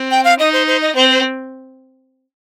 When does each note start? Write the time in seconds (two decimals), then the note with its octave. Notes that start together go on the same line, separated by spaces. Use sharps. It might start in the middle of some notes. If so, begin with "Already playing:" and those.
Already playing: C4
0.11 G5
0.24 F5
0.39 D#4 D#5
0.53 C5
0.67 C5
0.82 D#5
0.95 C4 C5
1.10 C5